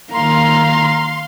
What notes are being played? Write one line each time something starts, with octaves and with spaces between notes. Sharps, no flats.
D#3 A#3 F5 A#5 C6